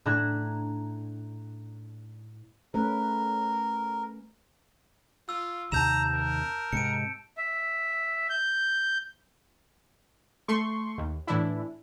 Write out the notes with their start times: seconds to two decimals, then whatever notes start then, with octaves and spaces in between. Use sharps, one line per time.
0.05 A2 D4 E5 A#5 F#6 G#6
2.74 A3 C#4 A#4 B4
5.29 F4 E6
5.72 D#2 C3 D#3 A5 A#5 G6 E7
6.14 A#4
6.72 G#2 C3 C#7 D7
7.38 E5
8.30 G6
10.48 A3 C6 C#6
10.98 D#2
11.27 A2 E3 D4 E4